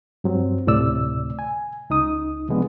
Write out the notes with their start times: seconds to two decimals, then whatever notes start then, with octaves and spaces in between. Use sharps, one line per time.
0.24 G2 F#3 C4
0.67 D2 A2 C3 D5 E6
1.39 G#5
1.90 C#2 D#4 D#6
2.49 C3 F3 G#3 B3 D4